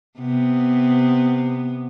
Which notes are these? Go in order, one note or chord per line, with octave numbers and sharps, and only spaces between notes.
C3 B3